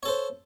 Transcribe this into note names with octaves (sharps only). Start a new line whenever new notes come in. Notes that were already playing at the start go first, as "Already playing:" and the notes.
A4 C5 C#5